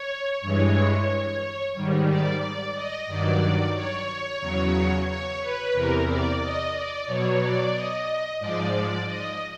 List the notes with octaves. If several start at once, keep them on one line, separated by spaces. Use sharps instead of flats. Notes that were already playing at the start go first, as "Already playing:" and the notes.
Already playing: C#5
G2 E3 G#3 C#5
G#2 D#3 G3
D5
D5
D#5
G2 D#3 F#3 D5
C#5
E2 C#3 F#3
C#5
B4
E2 C3 E3 A#4
D5
D#5
D5
B2 F#3 C#5
D5
D#5
G#2 F3 G#3 D5
D#5